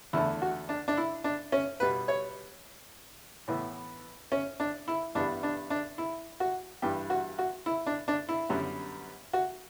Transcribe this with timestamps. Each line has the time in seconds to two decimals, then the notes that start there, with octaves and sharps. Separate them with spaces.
0.13 E2 D3 A3 E4
0.42 F#4
0.69 D4
0.88 D4
0.97 E4
1.24 D4
1.52 C#4
1.80 B2 G3 B3 B4
2.08 C#5
3.48 A2 E3 B3
4.32 C#4
4.60 D4
4.88 E4
5.15 G2 E3 G3 B3 D4
5.43 D4
5.70 D4
5.98 E4
6.40 F#4
6.82 G2 E3 G3 G4
7.10 F#4
7.39 F#4
7.66 E4
7.86 D4
8.08 D4
8.29 E4
8.49 F#2 D3 G3 B3
9.33 F#4